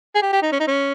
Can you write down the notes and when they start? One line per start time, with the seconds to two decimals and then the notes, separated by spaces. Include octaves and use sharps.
0.15 G#4
0.22 G4
0.33 G4
0.42 D#4
0.52 C#4
0.60 D#4
0.67 C#4